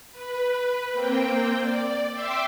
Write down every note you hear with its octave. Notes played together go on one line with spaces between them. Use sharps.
B4
A#3 C4 G5
D5
E5 G5 C6 D6 E6